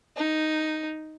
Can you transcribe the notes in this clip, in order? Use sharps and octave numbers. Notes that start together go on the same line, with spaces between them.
D#4